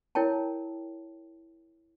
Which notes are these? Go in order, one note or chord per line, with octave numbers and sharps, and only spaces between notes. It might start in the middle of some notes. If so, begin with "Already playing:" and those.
E4 A#4 C#5 G5 A5